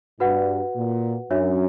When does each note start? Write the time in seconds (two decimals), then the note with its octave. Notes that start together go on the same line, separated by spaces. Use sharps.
0.20 G2 F#4 B4 F#5
0.76 A#2
1.31 F#2 D4 F#4 C#5 E5